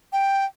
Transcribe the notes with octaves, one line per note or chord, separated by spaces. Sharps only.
G5